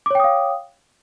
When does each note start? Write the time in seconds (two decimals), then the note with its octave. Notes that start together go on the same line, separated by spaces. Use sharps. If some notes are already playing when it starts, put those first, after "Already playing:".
0.06 D6
0.11 C#5
0.15 G5
0.20 D#6
0.24 F5